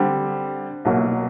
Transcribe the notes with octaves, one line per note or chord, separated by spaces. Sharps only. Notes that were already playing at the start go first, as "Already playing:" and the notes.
Already playing: D3 G3 C4
C2 B2 F#3 A#3